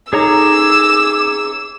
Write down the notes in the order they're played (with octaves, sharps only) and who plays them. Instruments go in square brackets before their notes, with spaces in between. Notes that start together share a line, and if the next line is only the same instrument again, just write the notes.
[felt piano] D#4 A4 [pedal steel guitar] G#4 C#5 A#5 [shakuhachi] D6 [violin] E6